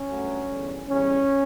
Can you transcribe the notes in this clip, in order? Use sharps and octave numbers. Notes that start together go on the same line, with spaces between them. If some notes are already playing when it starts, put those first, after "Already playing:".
Already playing: C#4
G2 F#3 A3
E2 D3 G3
E2 C#3 G3 C#4